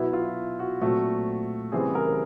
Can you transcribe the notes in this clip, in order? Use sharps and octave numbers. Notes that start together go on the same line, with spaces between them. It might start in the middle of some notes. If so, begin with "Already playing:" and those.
Already playing: B2 F#3 B3 E4
F4
F#4
A#2 F#3 A3 C4 F#4
C#3 E3 G3 C4 G#4
A#4